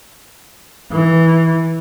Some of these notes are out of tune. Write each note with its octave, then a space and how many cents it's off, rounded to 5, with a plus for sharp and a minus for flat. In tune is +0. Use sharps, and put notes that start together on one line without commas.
E3 -10